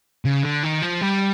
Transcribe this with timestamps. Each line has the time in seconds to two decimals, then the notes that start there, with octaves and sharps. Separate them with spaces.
0.25 C#3
0.43 D3
0.63 D#3
0.82 F3
1.01 G3